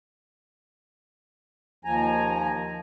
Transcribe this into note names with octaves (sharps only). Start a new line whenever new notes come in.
D#2 F3 G#5 A#5